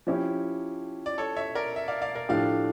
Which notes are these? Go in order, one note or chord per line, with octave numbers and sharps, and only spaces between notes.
F3 C#4 E4 G4
D5
A4 C#5
C#5 E5
A#4 D5
E5
D5 F5
D5 F5
A#4 D5
A2 F3 A3 D4 G4 D5 F5